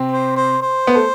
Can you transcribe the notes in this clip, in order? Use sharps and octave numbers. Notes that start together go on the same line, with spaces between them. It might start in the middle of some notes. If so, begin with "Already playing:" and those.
Already playing: C3 C4
C5
C5
C5
B3
A3